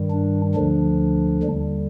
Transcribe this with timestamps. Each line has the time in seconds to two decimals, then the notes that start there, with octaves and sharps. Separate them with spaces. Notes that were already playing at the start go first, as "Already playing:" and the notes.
Already playing: G2 D#3 G3
0.10 D4
0.54 D2 D3 F3 D4
1.43 D#2 D3 G3